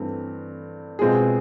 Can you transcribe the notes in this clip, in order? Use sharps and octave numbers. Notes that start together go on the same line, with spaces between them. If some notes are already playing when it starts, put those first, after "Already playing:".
Already playing: G2 E3 A3 C4
B2 G#3 C4 F4 G#4